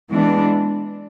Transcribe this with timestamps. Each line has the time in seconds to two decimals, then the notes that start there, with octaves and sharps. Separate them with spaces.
0.10 E3 G#3 B3 D4